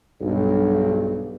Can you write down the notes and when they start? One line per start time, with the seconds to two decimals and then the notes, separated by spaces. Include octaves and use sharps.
0.21 B1 G2